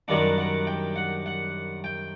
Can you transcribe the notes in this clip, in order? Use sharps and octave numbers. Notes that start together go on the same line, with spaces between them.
F#2 D#3 G3 D4 F#5
F#5
G5
F#5
F#5
G5